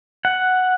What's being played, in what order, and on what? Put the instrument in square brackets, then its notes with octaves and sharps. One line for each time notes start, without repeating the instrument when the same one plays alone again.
[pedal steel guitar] F#5